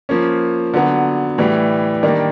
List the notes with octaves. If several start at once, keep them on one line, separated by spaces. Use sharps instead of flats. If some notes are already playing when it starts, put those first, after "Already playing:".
F3 A#3 C#4
D3 F#3 B3
A2 E3 G3
D#3 G3 A#3 D4